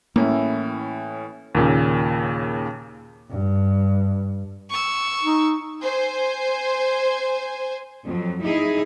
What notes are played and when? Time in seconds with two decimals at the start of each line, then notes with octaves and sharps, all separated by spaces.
0.16 A2 E3 A#3 C#4
1.55 D#2 A#2 C#3
3.31 G2
4.70 C#6 E6
5.23 D#4
5.82 C5 G#5
8.06 F2 F#3
8.45 D#4 E4 G#4